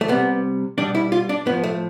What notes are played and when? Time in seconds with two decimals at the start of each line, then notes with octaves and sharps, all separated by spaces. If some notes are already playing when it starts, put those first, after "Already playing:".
0.01 A3
0.08 C3 G3 B3
0.78 B2 G3 D4
0.95 E4
1.12 F4
1.29 D4
1.46 A2 F3 B3
1.64 A3